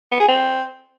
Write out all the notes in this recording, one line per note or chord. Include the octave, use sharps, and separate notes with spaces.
B3
G#4
C4